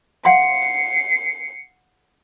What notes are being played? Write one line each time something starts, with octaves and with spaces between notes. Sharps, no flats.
F5 F#5 C6 C7 C#7